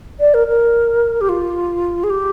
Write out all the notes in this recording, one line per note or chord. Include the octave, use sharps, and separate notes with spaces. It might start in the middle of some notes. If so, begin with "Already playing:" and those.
D5
A#4
A#4
G4
F4
G#4
G4